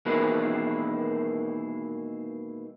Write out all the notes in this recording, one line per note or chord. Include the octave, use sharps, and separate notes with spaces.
B2 D#3 E3 G#3 A#3 E4